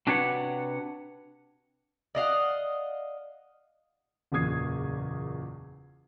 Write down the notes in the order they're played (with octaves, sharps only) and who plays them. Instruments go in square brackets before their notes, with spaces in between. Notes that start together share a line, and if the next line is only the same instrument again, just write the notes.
[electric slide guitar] C3 D4 F#4 B4 C#5 F#5
[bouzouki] D5 D#5 F5 F#5
[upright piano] F#1 E2 A#2 D#6 G#6 C7